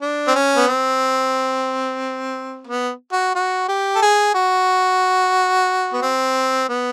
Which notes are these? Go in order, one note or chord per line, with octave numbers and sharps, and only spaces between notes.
D4
C4
C#4
B3
C4
B3
F#4
F#4
G4
A4
G#4
F#4
B3
C4
B3